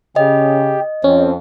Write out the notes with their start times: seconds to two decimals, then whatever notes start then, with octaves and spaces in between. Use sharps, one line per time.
0.16 C#3 G4 D#5
1.04 F2 C4 C#4